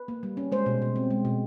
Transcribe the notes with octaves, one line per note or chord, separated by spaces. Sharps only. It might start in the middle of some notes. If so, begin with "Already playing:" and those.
Already playing: B4
A#3
G3
C#4
G#3 C5
B2
B2
C4
G#3
B2